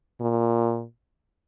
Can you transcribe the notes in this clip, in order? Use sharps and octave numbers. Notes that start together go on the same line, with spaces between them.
A#2